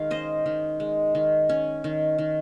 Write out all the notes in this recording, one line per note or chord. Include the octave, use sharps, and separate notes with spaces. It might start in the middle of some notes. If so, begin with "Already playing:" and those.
Already playing: D#3 G#3 F5
C#4 C5 D#5
D#3
G#3
D#3
C#4
D#3
D#3